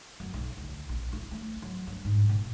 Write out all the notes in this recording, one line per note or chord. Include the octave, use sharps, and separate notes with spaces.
F#2
B1
D2
A#1
E4
A3
F#3
G2
G#2
A#2